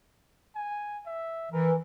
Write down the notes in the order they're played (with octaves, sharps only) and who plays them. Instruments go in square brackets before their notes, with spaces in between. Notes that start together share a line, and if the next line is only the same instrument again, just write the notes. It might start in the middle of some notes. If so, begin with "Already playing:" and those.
[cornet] G#5
E5
[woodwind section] E3 [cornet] A#4